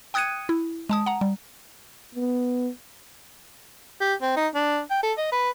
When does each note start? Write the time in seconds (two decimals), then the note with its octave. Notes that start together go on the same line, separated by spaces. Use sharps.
0.14 G5 D#6 F#6 G#6 C#7 D#7
0.49 E4
0.89 G#3 A5 D#6
1.06 F#5 A#5
1.21 G3
2.15 B3
4.01 G4
4.22 C4
4.36 D#4
4.55 D4
4.90 G5
5.03 A4
5.18 D#5
5.32 B4